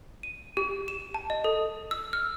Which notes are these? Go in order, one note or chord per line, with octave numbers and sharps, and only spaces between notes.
D#7
G4
E7
A5
D#5
A4
E6
F6